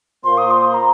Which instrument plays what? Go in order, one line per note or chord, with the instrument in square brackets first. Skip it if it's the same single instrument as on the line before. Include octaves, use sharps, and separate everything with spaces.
[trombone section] A#2 A#3 F4 C5 [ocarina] C6
[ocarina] D#6
C6
A#5